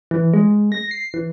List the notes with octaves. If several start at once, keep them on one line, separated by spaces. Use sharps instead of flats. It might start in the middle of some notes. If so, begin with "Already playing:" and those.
E3
G#3
A#6
C7
E3